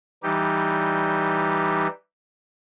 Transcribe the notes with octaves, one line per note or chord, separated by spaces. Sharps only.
E3 G3 D#4 G4